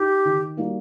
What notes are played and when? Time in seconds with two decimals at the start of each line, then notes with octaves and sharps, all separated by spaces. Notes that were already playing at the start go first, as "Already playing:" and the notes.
Already playing: D#4 G4
0.25 D#3
0.57 G3 A#3 D#4 F#4